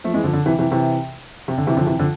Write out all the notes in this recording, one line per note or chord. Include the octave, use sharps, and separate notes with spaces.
F3 A3
E3 G#3
D3 F3
D3
C3 E3
C3 E3
C3 E3
C3
D3
C3 E3
D3 F3
C3 E3
D3 F3